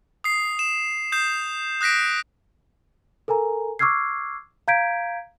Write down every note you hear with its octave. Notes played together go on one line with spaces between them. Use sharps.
D#6 C7
E7
D#6 G6 C7 E7
D#6 F#6 A#6 B6 D7
A4 A#4 G#5 A#5
C#6 D6 E6 F6 G#6 C7
F5 A#5 G6 G#6 B6 D7